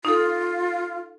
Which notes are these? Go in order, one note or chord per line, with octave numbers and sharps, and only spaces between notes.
D#4 F4 A4